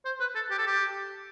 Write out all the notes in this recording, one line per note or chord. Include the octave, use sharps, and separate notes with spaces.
C5
B4
A4
G4
A4
G4